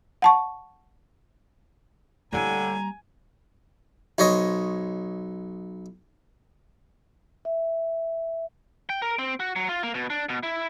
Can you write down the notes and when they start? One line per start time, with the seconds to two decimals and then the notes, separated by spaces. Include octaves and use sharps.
0.22 F#5 A5 C#6
2.32 A2 D3 G3 A#3 G#5 A#5
4.18 B1 C5 C#5 D#5
7.45 E5
8.89 G5
9.02 A#4
9.19 C4
9.40 F#4
9.56 F#3
9.69 F4
9.83 A#3
9.94 B2
10.10 D4
10.29 B2
10.43 E4